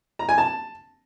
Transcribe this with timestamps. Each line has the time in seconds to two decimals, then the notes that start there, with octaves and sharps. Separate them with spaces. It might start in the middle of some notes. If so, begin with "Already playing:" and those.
0.19 A#5
0.29 G#5
0.38 A5